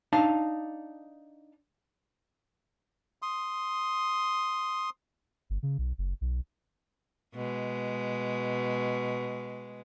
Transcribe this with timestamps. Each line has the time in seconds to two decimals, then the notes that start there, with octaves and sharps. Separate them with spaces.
0.13 D4 D#4 F5 A5
3.22 C6 D#6
5.50 G1
5.63 C#3
5.78 B1
5.98 F#1
6.21 B1
7.34 B2 G#3